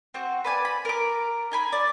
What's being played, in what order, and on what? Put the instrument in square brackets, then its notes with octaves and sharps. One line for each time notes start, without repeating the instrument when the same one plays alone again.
[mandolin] C4 F#4
B4 D5 G#5
B5
A#4 D6
D#4 G#5 B5
D5